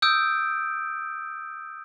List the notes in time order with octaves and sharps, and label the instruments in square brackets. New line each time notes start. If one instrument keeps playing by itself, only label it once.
[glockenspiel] D#6 E6 G6 D7